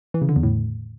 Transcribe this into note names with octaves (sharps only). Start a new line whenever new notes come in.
E3
C#3
D3
E2
A2